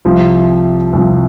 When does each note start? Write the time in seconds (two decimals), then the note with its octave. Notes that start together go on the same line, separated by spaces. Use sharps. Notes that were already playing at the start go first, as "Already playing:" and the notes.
0.05 C2 C3 F3
0.93 C2 C3 F3